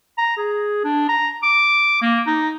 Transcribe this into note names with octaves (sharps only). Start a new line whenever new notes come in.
A#5
G#4
D4
A#5
D6
A#3
D#4